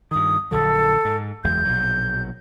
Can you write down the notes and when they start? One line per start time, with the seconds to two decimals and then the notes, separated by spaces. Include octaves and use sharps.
0.11 G2 D#3 D#6
0.51 A#1 D3 F#3 A4
1.05 G#2
1.44 F#1 E2 G#3 G6
1.65 A#1 B2 F#3